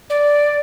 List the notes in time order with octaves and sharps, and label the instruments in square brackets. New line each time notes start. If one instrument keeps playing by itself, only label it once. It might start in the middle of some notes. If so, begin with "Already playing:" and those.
[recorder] D5